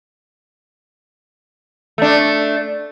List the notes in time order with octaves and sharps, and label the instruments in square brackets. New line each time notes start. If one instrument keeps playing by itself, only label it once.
[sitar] A3 D4